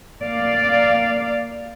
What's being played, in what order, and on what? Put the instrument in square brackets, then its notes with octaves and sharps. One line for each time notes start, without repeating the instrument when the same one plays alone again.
[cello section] A#3 D5 F5